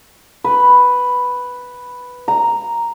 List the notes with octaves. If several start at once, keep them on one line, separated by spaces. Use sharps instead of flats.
B4
A#5